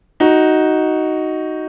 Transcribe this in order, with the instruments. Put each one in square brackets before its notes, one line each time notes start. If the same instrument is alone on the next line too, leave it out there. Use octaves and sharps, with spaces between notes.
[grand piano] D#4 F#4